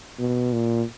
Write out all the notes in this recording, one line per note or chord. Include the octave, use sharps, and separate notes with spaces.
B2
A#2